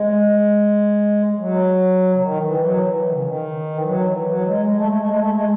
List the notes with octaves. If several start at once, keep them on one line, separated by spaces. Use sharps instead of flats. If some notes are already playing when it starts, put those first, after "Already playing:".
Already playing: G#3
F#3
C#3
D#3
E3
F#3
E3
D#3
C#3
D#3
E3
F#3
E3
F#3
G#3
G#3
A3
G#3
A3
G#3
A3
G#3